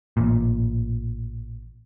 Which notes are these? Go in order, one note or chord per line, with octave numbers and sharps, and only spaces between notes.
A1 A#2